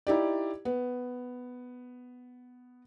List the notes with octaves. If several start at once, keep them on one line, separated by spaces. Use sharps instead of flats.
D#4 E4 G4 D5
B3